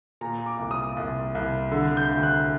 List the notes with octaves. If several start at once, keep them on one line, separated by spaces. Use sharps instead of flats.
A#2 A#5
D6
C2
D#6
C2
C2
D3
G6
D2
F#6